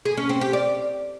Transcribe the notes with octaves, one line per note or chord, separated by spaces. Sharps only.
G#4
C#4
C4
G4
D5